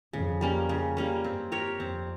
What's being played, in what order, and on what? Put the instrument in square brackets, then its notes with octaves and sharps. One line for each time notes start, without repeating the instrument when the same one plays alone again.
[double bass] F2 [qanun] C#3
[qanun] G3 A#3 C#4
C#3
G3 A#3 C#4
[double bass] G2 [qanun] C4
[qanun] G4 A#4 C#5
[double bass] F2 [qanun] C4